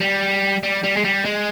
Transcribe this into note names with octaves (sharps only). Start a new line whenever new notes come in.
G3
G3
G3
G#3
G3
G#3